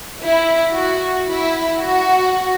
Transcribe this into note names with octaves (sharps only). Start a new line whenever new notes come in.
E4
F#4
E4
F#4